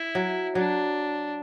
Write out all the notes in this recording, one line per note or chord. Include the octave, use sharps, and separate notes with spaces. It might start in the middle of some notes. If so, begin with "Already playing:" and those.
Already playing: E4
F#3
F#3 D4